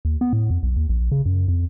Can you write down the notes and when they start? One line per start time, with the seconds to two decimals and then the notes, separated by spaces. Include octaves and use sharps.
0.05 D#2
0.21 B3
0.33 A2
0.51 F2
0.63 B1
0.76 D#2
0.89 A#1
1.12 C#3
1.26 F#2
1.48 F2